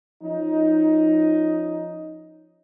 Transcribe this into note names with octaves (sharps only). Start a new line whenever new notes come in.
F3 C#4 D#4